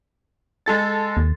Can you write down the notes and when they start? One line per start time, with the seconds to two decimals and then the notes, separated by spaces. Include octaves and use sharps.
0.66 G#3 A4 A6
1.17 D#2